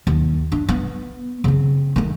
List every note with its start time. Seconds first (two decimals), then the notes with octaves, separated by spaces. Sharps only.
0.07 D#2
0.52 D4
0.69 B3
1.44 C#3 C4
1.96 D#3 A3